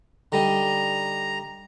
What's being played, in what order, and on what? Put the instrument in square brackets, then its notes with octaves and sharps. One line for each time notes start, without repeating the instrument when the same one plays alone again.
[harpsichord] D3 G3 D#4 [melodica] A#5